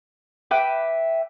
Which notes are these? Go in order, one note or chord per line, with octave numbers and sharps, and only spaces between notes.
B4 E5 G5 D6